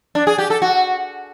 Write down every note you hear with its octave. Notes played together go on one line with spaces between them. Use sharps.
D4
G#4
G4
A4
F#4